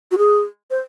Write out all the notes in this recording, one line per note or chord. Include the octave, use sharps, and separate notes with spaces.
F#4
G#4
C5